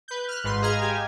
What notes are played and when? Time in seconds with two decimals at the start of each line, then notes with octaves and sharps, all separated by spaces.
0.08 B4 G6
0.28 F6 F#6
0.43 G#1 G#2 B4 C6
0.62 G#4 D#5 F5 A#5 F6 G#6
0.81 G4 G#5